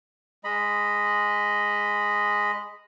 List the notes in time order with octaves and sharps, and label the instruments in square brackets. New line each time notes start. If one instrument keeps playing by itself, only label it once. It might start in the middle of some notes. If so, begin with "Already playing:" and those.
[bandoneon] G#3 D#5 B5